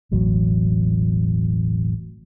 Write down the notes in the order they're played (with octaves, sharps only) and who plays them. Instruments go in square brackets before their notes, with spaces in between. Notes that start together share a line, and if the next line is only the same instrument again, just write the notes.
[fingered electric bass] E1 A1 F#3